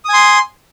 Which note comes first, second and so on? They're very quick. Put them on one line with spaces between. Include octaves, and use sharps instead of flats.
D#6 G#5 C6